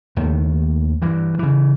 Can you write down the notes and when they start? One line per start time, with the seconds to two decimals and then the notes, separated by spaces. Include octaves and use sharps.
0.16 D#2 D#3 A3
1.02 G2 E3
1.39 C#3 E3